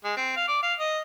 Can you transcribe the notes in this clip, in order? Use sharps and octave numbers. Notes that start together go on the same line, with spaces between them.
G#3
C4
F5
D5
F5
D#5